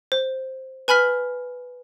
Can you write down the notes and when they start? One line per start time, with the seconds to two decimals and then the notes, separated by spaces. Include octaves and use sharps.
0.12 C5
0.88 B4 G#5 B5 F6 B6